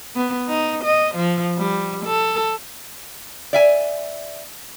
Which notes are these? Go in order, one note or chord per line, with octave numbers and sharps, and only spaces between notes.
B3
D#4
D#5
F3
G3
A4
D5 E5 G#5